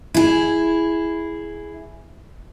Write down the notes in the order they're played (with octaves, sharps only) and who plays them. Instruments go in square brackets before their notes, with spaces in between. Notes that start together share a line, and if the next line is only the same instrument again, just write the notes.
[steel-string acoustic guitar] E4 G#4